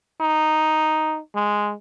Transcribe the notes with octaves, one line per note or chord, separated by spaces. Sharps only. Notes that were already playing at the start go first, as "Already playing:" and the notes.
D#4
G#3